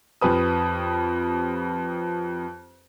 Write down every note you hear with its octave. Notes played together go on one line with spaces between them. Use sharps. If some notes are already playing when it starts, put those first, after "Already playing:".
F2 G4 B4 D#6